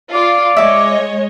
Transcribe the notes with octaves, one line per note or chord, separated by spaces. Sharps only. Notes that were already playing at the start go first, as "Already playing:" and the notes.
F4 D5
G#3 C#5 D#5 E5 D6